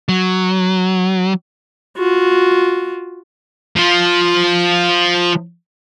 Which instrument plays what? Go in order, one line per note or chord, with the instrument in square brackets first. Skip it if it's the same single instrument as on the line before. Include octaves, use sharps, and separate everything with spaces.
[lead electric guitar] F#3
[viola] F4 F#4
[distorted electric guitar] F3 F4